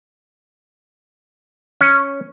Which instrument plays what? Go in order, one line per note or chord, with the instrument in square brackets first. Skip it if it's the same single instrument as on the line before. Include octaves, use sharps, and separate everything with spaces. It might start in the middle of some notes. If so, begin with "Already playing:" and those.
[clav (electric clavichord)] C#4